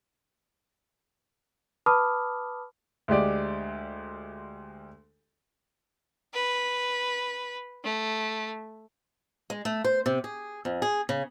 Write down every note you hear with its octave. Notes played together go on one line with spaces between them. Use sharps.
B4 A5 B5 D6 D#6 F6
D2 G#3 G4 D5
B4
A3
G#3
A3
C5
C3
G#4
F2
G#4
C#3